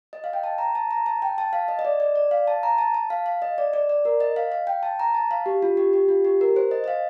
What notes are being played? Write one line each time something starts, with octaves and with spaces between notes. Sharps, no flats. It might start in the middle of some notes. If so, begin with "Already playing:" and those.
D#5
F5
G5
A5
A#5
A5
A#5
A5
G5
A5
F5
D#5
D#5
D5
D5
D5
F5
A5
A#5
A5
A5
F5
F5
D#5
D5
D5
D5
A#4
D#5
F5
F5
G5
A5
A#5
A5
F5
G4
F4
G4
G4
F4
G4
A#4
C5
D#5
D#5
F5